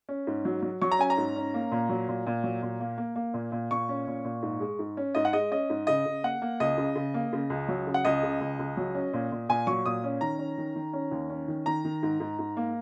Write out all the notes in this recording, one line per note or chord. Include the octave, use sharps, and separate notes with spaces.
C#4
G#2
F#3
F#3
F#3 C#6
A#5
C#4 G#5
A#5
G#2
C#4
A#3
A#2
F#3
A#2
A#2
F#3
A#2
A#3
A#3
A#3
A#2
A#2
A#2 C#6
C#4
A#2
A#2
G#2
G#3
G#2
C#4
G#2 D#5
F#5
G#3 D#5
C#4 D#5
G#2
C#3 D#5
C#3
A#3 F#5
A#3
C#2 D#5
C#3
C#3
A#3
C#3
C#2
F#3
C#3
F#5
C#2 D#5
C#3
C#2
C#2
F#3
C#4
A#2
A#2
A#2 G#5
F#3 C#6
A#2 D#6
C#4
D#3 A#5
C#4
D#3
D#3
C#4
D#2
C#4
D#3
D#3 A#5
D#3
G#2
G#2
G#2
A#3